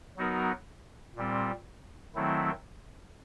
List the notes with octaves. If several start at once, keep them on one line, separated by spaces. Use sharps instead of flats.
F#3 B3 D#4 F#4 A#4
A#2 G3 C4
D#3 F#3 A3 C4 E4